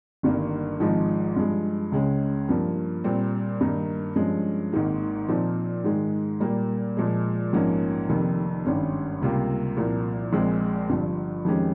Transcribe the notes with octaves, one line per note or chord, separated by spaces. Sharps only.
G1 G2 D#3 A#3
G#1 G#2 F3 G#3 D#4
G2 F3 G#3
C#2 C#3 G#3 C#4
G2 F3 A#3
A#2 G3 C4
G2 D#3 A#3 D#4
G2 F3 G#3 C#4
G#1 G#2 D#3 A#3
A#2 F3 C4 D#4
G#2 D#3 G#3
A#2 G3 A#3
A#2 F3 G#3
A#1 G#2 F3 A#3 C#4
F1 F2 C3 D#3 A#3
G#1 G2 G3 C#4
C#2 C3 G3 A#3 F4
C2 A#2 F3 A#3
A#1 A#2 G#3 C4
G1 G2 F3
F2 D#3 G#3 C#4 G4